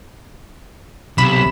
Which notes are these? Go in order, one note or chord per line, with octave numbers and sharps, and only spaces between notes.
B1 C3 B5 E7